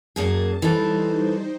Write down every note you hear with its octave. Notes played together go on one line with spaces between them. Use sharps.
F#2 A#3 G#4 A5
E3 G3 D#4 A4 C5